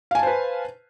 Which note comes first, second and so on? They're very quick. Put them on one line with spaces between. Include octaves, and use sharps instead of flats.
F5 G#5 A5 C5 B4